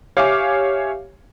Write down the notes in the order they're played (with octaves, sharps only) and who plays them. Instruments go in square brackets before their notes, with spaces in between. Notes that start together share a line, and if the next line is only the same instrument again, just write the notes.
[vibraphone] G4 [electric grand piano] C#5 E5 G#5 [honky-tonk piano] F5 D6